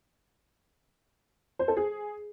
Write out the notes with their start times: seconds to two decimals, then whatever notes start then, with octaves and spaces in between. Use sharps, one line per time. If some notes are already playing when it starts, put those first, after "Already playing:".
1.59 C5
1.68 A4
1.77 G#4